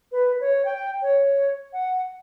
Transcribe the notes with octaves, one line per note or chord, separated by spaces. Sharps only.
B4
C#5
G5
C#5
F#5